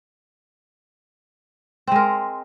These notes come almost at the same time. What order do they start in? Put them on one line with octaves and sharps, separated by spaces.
C4 G#3 A#4